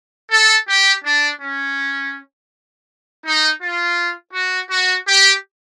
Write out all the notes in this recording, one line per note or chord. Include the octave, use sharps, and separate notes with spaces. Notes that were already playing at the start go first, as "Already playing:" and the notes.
A4
G4
D4
C#4
D#4
F4
F#4
F#4
G4